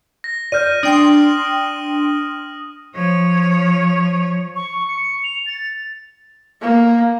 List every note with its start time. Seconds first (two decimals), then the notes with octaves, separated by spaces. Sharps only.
0.24 A#6
0.52 D5 F6 G6 D#7
0.83 D4 G5 C6 D#6
2.94 F3 C#5
4.56 C#6
4.88 C#7
5.24 F7
5.46 A6
6.61 A#3